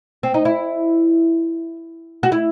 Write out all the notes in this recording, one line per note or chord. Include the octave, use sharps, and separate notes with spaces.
C4
D#4
E4
F#4
E4